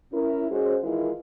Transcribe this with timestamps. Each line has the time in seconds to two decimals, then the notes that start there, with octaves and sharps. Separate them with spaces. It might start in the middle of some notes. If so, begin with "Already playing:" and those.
0.13 C#4 E4 A#4
0.51 G#3 C#4 F#4 G#4 C5
0.83 D#3 E3 G#3 E4 F4 A#4